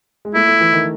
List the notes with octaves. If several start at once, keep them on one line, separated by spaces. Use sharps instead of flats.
G#3
A3 E4
A3
E3
D#3